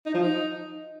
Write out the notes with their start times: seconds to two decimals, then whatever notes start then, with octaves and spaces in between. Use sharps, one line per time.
0.06 D#4
0.14 F3
0.22 D#4